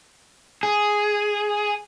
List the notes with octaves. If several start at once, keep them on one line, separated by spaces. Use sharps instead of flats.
G#4